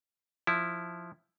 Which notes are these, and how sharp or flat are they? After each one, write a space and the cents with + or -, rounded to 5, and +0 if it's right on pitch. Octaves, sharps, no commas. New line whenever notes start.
F3 +0 E4 +0